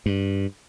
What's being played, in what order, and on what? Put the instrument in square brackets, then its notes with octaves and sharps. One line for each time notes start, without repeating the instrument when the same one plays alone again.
[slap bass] G2